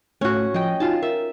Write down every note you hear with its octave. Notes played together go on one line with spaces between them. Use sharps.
A2 A3 C#4 F#4
F3 D#5 G5
D#4 F4 F#4 G#5 A5
A#4 E5